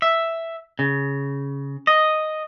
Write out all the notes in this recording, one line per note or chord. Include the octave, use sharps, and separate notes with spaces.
E5
C#3
D#5